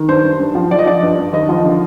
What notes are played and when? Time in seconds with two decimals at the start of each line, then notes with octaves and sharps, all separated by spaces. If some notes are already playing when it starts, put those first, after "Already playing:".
Already playing: D#3
0.08 G2 C5
0.24 G2
0.39 G2
0.55 F3
0.71 F3 D5
0.79 D#5
0.86 F3 D5
1.02 G2
1.18 G2
1.33 D#2 D#5
1.49 F3
1.65 D3